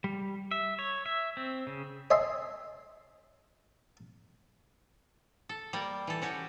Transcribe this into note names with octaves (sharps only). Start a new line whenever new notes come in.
G3
E5
C#5
E5
C4
C#3
C#5 D#5 E5 G#5 C6
A4
G3 A#3 D5
E3 A4
C#4 F#4 G4